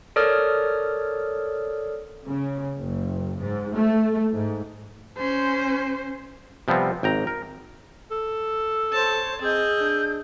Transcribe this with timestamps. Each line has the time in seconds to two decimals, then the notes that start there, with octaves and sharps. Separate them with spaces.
0.16 A4 A#4 C#5 D5 D#6 F6
2.26 C#3
2.79 F#1
3.40 G#2
3.76 A3
4.32 G#2
5.17 C#4 C5
6.68 C3 F3 G3 B3 C4
7.03 G#1 G5 A#5
7.27 A#4
8.11 A4
8.93 C5 C#5 A5
9.41 C4 G#4 D#5 E6 G6
9.80 D4